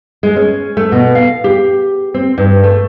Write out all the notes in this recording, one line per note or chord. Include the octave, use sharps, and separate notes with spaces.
G#3
C#4
A3
B2
F5
G4
C4
G2
A3